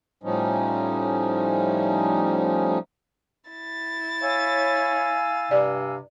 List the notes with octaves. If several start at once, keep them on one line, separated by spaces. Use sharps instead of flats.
A2 F3 G3 C#4 D#4
E4 A6
C#5 F5 G#5 E6
G2 C3 D5